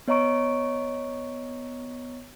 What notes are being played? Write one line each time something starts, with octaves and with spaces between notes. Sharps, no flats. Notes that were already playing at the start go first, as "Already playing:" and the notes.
B3 C#5 D#5 A#5 C#6 D7